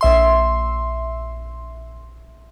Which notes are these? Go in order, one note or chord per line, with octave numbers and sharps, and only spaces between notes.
A#1 E5 C6